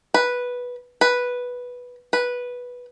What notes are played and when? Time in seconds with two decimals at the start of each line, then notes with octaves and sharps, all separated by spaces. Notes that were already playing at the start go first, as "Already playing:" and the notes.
0.14 B4
1.01 B4
2.13 B4